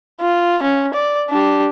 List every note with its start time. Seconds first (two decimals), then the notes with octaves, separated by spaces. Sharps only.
0.21 F4
0.63 C#4
0.94 D5
1.30 D4 G4